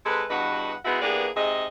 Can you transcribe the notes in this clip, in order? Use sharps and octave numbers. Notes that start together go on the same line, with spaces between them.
C3 G#3 A4 B4
E2 G2 F#4 B4 D#5 F#5
G#3 B3 D#4 E4 F#4 G#4
E3 A#3 B3 D4 G4 G#4
G#2 C3 G#4 D#5